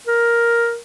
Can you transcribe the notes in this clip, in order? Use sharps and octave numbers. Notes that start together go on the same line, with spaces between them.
A#4